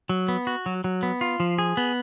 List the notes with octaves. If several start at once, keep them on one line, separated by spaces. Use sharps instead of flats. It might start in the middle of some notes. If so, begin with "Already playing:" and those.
F#3
B3
F#4
F#3
F#3
B3
F4
F3
G#4
B3